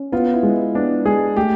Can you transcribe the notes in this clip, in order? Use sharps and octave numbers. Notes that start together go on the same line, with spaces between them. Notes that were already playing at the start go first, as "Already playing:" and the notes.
Already playing: C#4
B3 F4
E4
G#3
B3 D4
G#3 G#4
A3 G4